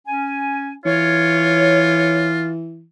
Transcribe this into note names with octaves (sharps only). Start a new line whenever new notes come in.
C#4 G#5
E3 F4 C#5